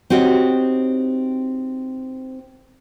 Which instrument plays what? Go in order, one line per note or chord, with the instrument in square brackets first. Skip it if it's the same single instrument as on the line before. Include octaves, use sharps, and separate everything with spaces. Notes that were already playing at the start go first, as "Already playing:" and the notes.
[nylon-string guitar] C4 D#4 F#4 G4 C#5